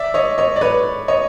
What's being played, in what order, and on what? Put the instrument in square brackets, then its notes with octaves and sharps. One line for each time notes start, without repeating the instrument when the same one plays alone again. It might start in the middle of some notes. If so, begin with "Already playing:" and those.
Already playing: [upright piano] D5 E5
C#5 D#5
C#5 D#5
D5
B4 C#5
C#5 D#5